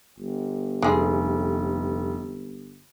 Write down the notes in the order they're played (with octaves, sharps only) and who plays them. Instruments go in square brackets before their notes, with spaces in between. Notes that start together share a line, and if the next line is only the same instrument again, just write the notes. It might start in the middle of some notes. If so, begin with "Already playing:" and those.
[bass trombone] G1
[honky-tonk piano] F1 [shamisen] G#3 G#4